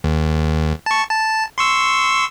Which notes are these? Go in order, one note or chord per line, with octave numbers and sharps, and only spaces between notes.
D#2
A5 C#6
A5
C6 C#6 E6